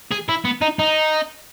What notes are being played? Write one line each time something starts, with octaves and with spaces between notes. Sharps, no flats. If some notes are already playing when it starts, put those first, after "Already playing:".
G#4
E4
B3
D#4
D#4